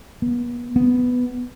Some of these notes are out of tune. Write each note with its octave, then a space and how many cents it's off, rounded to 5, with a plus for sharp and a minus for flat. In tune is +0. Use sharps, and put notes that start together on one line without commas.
B3 -40
B3 +5